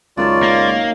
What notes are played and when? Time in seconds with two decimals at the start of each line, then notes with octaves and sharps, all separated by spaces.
0.17 C#2 F#2 D#3 F4 D5 A5
0.43 A#3